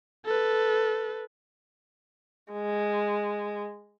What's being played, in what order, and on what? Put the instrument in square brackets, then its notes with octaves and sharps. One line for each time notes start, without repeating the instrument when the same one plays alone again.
[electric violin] A4 B4
[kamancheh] G#3